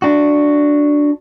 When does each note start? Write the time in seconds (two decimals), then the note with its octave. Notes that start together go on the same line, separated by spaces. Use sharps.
0.02 D4 F#4